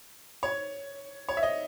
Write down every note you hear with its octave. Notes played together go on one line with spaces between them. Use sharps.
C#5
C#5
E5
D#5